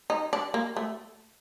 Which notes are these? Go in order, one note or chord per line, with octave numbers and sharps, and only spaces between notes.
D#4
D4
A#3
A3